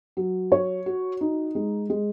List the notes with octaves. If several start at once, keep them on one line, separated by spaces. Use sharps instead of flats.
F#3
C#5
F#4
D#4
G#3
G#3